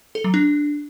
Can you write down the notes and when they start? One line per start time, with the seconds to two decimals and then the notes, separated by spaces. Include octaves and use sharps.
0.15 A4
0.24 F#3
0.34 D4